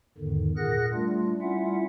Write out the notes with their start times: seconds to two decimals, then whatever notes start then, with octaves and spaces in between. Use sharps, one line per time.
0.18 E2 G#2 D3 D#3
0.57 A#2 G#4 A#4 F#5 F#6 A#6
0.93 G3 A3 D4 F4
1.41 G3 C#4 E4 F4 E5 F#5